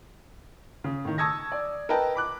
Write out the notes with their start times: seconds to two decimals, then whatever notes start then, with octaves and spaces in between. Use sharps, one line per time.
0.84 C#3
1.05 A2 D#3
1.18 A5 C#6 D#6 E6 G#6 A#6
1.52 D5
1.89 A#4 B4 D#5 G5 A5
2.15 B5 D6 F#6